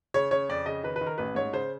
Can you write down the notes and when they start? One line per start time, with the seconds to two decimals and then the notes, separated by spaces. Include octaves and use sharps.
0.14 C#3 C#5
0.31 C#3 C#5
0.49 F2 D5
0.66 C#3 D#5
0.83 D#3 B4
0.96 B4
1.01 D#3
1.06 A#4
1.18 A1 B4
1.35 G#2 C#5
1.53 C#3 C5